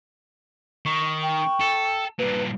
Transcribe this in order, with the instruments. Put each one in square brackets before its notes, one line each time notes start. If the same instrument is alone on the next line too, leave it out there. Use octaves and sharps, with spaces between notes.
[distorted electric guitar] D#3 [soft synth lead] C#6
[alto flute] G5
[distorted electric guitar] A4
[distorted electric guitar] G2 A#2 [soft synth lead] B4